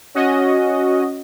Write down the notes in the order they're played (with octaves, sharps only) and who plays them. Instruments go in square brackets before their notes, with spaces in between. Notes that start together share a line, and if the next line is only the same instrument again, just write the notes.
[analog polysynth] C#4 F#4 D#5